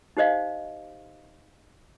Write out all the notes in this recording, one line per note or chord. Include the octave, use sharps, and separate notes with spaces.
D#4 G4 C5 D#5 F5